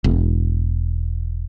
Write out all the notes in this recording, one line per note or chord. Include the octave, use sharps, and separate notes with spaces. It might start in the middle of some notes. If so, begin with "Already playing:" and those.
E1